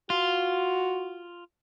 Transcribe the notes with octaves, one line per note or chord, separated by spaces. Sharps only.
F4 F#4